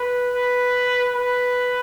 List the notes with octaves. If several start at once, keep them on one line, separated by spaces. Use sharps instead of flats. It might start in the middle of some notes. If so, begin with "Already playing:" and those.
Already playing: B4
B4
B4